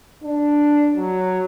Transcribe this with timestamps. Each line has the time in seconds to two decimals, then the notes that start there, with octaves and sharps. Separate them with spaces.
0.24 D4
0.96 F#3